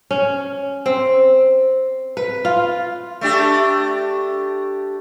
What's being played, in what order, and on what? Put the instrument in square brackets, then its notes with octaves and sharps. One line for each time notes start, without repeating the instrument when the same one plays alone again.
[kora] C#4
C4
B4
F4
[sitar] A3 D4 G4